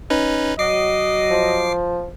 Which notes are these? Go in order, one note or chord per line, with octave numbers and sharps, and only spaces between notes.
C#4 D#4 B4
F#3 D#5 D6 C7
F3